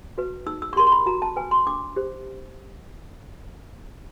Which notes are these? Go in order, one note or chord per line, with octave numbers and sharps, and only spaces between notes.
F#4 B4
D#4 E6
E6
C#6
G4 A#4 C6
C6
B5
F#4 A#5
A5
B4 G#5
C6
D4 D6
G4 C5